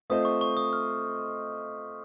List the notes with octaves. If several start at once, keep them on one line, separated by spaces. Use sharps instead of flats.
A3 C4 F4 C5 D#5 D#6
C#6
C#6
D#6
F6